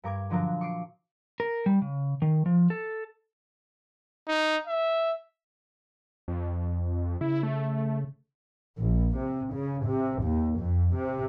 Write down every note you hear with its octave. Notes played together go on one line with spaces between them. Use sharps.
G2 A#4 D6 G#6
A#2 D3 F3 F#3 D4 A#4
C#6 D6 C7 D7
A#4
G3
C#3
D#3
F3
A4
D#4
E5
F2
C#3 E4
A3
A#1
C3
C#3
C3
D#2
F2
C3